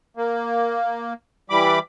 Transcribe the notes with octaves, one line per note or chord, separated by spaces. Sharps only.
A#3
E3 G3 B5 D6